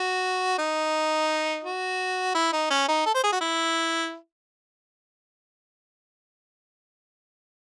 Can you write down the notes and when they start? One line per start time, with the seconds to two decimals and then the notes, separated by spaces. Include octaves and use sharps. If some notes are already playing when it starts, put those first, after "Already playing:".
Already playing: F#4
0.58 D#4
1.64 F#4
2.35 E4
2.53 D#4
2.70 C#4
2.88 D#4
3.06 A4
3.15 C5
3.24 G#4
3.32 F#4
3.41 E4